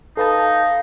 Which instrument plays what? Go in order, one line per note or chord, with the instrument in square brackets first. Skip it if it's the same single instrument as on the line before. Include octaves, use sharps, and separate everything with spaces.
[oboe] D#4 [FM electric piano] A4 B4 A5 [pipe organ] F5